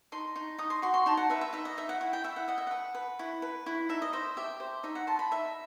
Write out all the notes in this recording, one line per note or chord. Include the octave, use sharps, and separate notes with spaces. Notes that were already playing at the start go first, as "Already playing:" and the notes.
D#4 C6
D#4
D#4 D#6
C6
F#4 C6
C6
D#4 A5
F#5
B4 E5
E5
D#4 E5
D#5
D#4 E5
F#5
E4 F#5
G5
E4 E5
F#5
D#5 F#5
E5
B4 F#5
B4
E4
B4
E4
D#4 E5
D#5
C5 E5
G4 E5
C5
D#4 E5
F#5
C5 A5
B5
D#4 E5